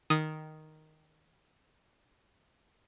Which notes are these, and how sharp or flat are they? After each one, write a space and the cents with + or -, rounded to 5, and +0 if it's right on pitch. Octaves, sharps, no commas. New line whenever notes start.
D#3 +0 D#6 +0